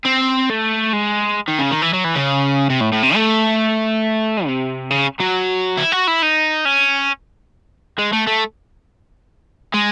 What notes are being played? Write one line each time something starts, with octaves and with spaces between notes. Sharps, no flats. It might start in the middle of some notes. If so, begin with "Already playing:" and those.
C4
A3
G#3
D#3
C#3
D#3
E3
F#3
E3
C#3
C3
A2
A2
C3
A3
C3
C#3
F#3
E4
F#4
E4
D#4
C#4
G#3
A3
A3
G#3